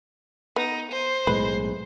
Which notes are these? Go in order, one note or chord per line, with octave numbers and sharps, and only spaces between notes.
B3 D#4
C5
B1 A2 G#3 B4